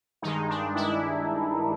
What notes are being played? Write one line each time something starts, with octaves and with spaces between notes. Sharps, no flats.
G2 D#3 G#3 D#4
D4
E4